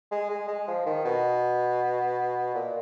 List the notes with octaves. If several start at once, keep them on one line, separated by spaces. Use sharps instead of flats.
G#3
G#3
G#3
F3
D#3
B2
A#2